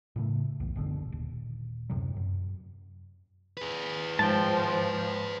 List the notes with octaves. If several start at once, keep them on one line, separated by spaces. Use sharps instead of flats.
A2 C#3 A3
B1 E2
F#1 B2 D3
D#1
F#2 C3 F#3
F#2
G#4 B4
G#2 F3 G5 A5